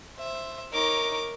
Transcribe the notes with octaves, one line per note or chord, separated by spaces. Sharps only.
C5 E5
D#4 A#4 C#5 D6